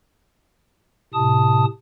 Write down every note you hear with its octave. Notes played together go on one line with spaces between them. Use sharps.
A2 C3 A5 D#6